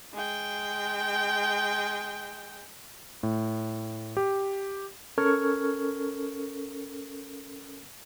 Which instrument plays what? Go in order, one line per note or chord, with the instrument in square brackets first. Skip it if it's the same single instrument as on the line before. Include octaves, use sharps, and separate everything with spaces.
[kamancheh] G#3 G5
[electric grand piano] A2
G4
[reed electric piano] C#4 A4 A#4 C#6 F6 G#6